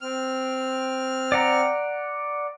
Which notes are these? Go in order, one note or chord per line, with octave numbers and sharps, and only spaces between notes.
C4 F6
D5 F#5 A#5